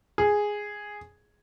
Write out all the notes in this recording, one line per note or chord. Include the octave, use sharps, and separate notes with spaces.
G#4